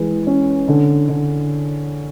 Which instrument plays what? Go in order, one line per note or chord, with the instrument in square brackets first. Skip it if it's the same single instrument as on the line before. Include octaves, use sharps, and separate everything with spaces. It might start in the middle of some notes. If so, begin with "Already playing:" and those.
Already playing: [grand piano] E3 G#3
C#4
D3
D3